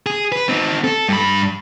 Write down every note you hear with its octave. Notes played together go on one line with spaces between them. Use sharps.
G#4
B4
C4 D#4
A4
G2 B5